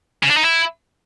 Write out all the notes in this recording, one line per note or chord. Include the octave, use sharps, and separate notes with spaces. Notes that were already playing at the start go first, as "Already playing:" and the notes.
C#3
D4
D#4
E4